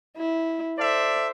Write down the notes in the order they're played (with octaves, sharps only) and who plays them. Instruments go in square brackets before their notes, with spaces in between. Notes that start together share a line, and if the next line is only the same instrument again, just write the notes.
[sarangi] E4
[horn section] A4 D5 E5 [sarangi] C5